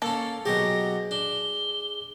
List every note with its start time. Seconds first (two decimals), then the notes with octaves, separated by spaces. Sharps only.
0.02 A#3 C#4 A4
0.46 B2 F#3 G4 G#4 A#6
1.11 D4 G7